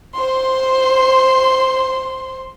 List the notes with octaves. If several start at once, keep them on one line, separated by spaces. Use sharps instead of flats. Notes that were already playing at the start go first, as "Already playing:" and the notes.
C5 C6